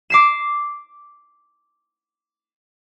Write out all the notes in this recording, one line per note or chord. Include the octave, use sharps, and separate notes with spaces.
D6 C7 E7